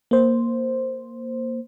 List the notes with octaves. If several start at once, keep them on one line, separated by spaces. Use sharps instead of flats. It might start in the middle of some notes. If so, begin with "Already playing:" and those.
A#3 C5